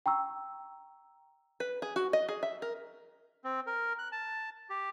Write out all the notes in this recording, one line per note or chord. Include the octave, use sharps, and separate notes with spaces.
G5 A#5 C#6 E6
B4
G#4
F#4
D#5
G#4
E5
A#4
C4
A#4
F#6
A5
G4